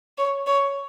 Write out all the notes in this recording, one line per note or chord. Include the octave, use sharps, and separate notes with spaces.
C#5
C#5